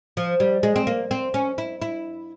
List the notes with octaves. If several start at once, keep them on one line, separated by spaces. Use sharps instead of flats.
F3
G3
G#3
C4
A#3
C4
C#4
E4
E4